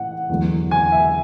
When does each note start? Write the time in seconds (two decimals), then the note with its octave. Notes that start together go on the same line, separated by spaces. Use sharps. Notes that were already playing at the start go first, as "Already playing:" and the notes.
Already playing: A2 E3 F#5
0.29 E2 D3 F#3
0.71 G#5
0.92 E5